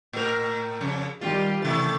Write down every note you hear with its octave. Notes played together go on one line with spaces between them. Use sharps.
A2 A#4
F2 C#3
D#3 G3 F4 G4
C3 D#3 E3 A3 E4 A6